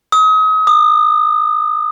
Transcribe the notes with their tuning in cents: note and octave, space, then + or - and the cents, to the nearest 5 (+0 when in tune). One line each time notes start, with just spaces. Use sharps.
D#6 +35
D#6 -40